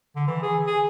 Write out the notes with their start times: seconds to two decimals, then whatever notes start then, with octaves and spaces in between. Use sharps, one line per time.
0.16 D3
0.28 E3
0.42 G#4
0.67 G#4